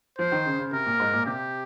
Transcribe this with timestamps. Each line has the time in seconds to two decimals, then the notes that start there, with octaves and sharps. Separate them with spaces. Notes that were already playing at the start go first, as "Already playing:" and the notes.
0.18 F3 C5
0.32 D#3
0.46 C#3
0.59 C#3
0.72 C3 A#4
0.86 A#2
1.00 G#2
1.14 A#2
1.26 C3 G4